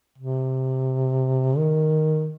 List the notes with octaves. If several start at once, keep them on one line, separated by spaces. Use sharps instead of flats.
C3
D#3